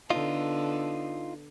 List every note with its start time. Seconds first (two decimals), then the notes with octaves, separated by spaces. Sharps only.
0.10 D3 B3 D#4 F4 A4